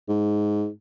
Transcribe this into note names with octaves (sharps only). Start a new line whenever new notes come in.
G#2